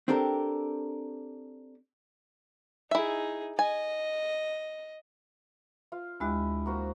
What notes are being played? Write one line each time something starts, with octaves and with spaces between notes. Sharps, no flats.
C4 D4 G4 A4 A#4
D#4 E4 G#4 E5
D#5 G#5
F4 F5
D2 G#3 E4 G4 D#5 F#6
A#3 F#4 C5